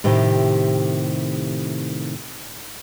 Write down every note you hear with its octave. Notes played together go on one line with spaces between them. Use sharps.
A2 C3 D#3 G4 C5